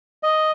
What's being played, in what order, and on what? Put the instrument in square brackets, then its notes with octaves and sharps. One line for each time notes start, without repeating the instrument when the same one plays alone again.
[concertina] D#5